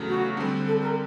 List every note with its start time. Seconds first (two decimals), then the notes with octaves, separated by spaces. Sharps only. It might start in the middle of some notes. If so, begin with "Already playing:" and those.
Already playing: E2 C#3 F#3 A3
0.08 F#4
0.37 D3 G3 C4
0.67 A4
0.81 A#4